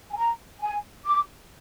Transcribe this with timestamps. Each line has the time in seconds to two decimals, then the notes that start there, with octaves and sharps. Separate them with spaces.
0.12 G#5
0.17 A#5
0.62 G#5
1.05 D6